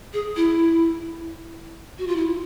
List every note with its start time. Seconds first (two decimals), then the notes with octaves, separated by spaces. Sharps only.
0.13 G#4
0.36 E4
1.99 F#4
2.07 F4
2.16 E4